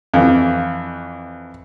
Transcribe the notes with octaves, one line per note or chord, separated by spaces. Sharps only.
F2 E3